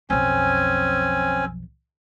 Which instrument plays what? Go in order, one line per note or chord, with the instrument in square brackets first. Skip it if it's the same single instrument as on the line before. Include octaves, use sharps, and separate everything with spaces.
[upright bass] B1 F2 [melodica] C4 C#4 G#5